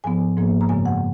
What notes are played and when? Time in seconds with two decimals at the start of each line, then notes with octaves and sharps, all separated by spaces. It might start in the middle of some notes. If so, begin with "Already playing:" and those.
0.04 G#2 F3 B3 G#5
0.37 G#2 F3 A#3
0.61 A#5
0.69 F#2 C#3 G#3 B3 G#5
0.86 F#5